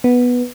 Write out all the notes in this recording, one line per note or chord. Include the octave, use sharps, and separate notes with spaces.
B3